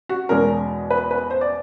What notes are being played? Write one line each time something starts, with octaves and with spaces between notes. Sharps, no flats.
F#4
E2 B2 G#3 C#4 A#4
B4
B4
C5
D5